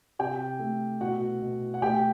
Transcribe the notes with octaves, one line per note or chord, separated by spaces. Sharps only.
C3 G4 G5
A3
B2 F#4 F#5
B2
F#5
A3 G4 G5